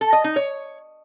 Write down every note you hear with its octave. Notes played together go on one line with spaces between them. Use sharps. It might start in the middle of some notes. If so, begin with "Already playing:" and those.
A4
D#5
D#4
C#5